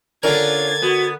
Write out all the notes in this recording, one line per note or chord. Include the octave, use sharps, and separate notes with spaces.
D3 C#4 D4 F4 A#4 D5 G#6 A6
B3 F#4